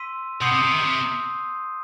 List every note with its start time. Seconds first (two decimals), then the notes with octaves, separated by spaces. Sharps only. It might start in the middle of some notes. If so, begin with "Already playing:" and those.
Already playing: C6 E6 B6 D#7
0.41 B2 C6 D#6 G6 C7 D#7
0.52 C3
0.62 C3
0.71 D#3
0.80 C3